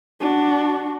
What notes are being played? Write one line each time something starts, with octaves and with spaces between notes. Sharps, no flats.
D4 F#4